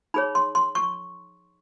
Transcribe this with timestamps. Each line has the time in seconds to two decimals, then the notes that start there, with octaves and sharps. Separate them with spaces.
0.14 D#4 G#4 C#5 B5
0.35 C6
0.55 C6
0.75 C#6